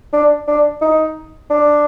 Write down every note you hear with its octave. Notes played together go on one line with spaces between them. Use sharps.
D4
D4
D#4
D4